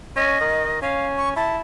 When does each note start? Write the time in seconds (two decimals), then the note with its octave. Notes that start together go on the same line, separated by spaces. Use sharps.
0.16 C#4 D#5
0.41 D#3
0.82 C#4 F5
1.18 C#6
1.36 E4 A5